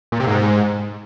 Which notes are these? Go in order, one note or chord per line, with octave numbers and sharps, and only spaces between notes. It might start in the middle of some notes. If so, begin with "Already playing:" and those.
A#2
C3
G#2